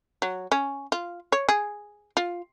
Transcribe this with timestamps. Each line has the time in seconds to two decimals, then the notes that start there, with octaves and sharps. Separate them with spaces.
0.22 F#3
0.52 C#4
0.92 F4
1.32 C#5
1.49 G#4
2.17 F4